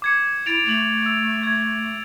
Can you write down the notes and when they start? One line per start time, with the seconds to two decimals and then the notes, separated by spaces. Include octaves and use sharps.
0.02 D6 G#6 C#7
0.46 E4 A6 D7 F7
0.66 A3 F7 F#7
1.03 E6 F7
1.43 G#6